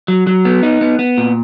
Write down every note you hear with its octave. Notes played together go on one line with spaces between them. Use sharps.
F#3
F#3
B3
D#4
B3
B3
A#2